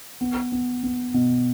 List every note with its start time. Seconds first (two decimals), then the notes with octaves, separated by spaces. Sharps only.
0.21 B3
0.52 B3
0.83 B3
1.14 B2